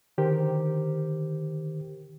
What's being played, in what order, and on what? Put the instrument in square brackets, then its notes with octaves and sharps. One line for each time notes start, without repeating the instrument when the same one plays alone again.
[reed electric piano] D3 D#3 G4 A#4 C5